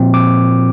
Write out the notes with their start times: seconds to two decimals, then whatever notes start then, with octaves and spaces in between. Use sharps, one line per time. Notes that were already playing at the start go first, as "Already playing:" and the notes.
Already playing: A#2 F3 C4
0.14 D6